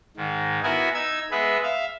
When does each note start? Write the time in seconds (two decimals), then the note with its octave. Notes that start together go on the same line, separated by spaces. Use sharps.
0.17 G#2 D#3
0.63 B3 E4 F#4 A#4 B4 G#5
0.94 D#4 E6 G#6
1.31 G#3 B3 G#4 B4 E5
1.63 E5 F5